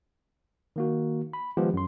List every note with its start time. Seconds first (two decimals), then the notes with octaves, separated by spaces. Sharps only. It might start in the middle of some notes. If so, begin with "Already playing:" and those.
0.76 D#3 A#3 F#4
1.33 B5
1.57 D#3 F3 G#3 B3 F4 G4
1.74 F#2 C6